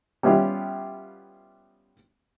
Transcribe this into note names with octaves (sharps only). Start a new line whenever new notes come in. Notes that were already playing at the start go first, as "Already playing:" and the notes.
G3 B3 C#4 E4 F4 G4